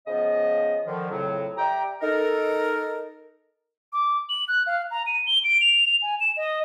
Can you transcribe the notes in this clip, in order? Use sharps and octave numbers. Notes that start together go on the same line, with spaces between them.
C#3 F3 B3 D#5
D3 D#3 F3
F2 A2 C#3 F#3
G4 D5 E5 G5 A#5
D#4 A4 A#4
D6
F#7
F#6
F5
A#5
D#7
G7
D7
F7
G#5
E7
D#5